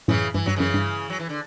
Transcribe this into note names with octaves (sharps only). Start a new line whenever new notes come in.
F#2 A2 C#3 E3
G2 E3
G2 F#3
F#2 C#3 E3
G2
F#3
E3
D3